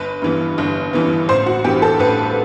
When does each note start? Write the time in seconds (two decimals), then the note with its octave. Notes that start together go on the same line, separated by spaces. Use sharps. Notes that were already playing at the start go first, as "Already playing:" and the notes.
Already playing: G1 B4
0.22 G2 E3 B3
0.58 G1
0.93 G2 E3 B3
1.29 A1 C5
1.46 F#4
1.64 G2 E3 B3 G4
1.82 A4
1.99 A1 B4